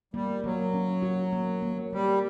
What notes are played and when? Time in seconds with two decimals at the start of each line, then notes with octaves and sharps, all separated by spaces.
0.14 G3 A#3
0.44 F#3 A#3
0.74 C#4
1.03 F#4
1.33 A#3
1.62 A#3
1.92 G3 A#3